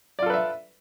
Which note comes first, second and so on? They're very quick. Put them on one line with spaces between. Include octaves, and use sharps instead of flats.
D5 F4 A4 B4 E5